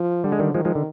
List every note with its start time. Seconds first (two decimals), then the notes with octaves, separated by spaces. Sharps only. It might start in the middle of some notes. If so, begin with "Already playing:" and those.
Already playing: F3
0.24 D3 G3
0.32 G#3
0.39 D#3 G3
0.54 D#3 F3 G#3
0.65 F3 G#3
0.75 D3